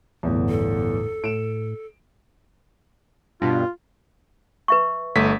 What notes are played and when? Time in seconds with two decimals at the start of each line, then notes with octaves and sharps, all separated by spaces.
0.23 G1 E2 A2
0.49 A4
1.24 A2 D7 E7
3.42 G2 B2 F4
4.68 B4 E5 C#6
5.15 G1 A3 B6